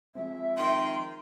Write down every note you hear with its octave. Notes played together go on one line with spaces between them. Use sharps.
F3 G#3 C4 E5
D#3 G5 C6